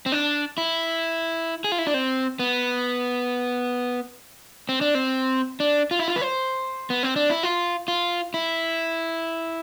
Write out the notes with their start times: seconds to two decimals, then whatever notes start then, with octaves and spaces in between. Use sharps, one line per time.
0.06 C4
0.12 D4
0.58 E4
1.64 G#4
1.72 F4
1.79 E4
1.87 D4
1.94 C4
2.39 B3
4.69 C4
4.81 D4
4.95 C4
5.60 D4
5.91 F4
5.99 E4
6.08 F4
6.16 B4
6.21 C5
6.90 B3
7.03 C4
7.16 D4
7.30 E4
7.43 F4
7.88 F4
8.34 E4